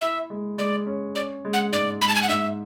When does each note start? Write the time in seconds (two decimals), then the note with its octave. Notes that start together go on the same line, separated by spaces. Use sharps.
0.01 E4 E5
0.30 G#3
0.58 G#3 D5
0.86 C#4
1.15 C#4 D5
1.45 G#3
1.53 F#5
1.72 G#2 D5
2.01 G#3 B5
2.08 A5
2.15 G#5
2.22 F#5
2.29 G#2 E5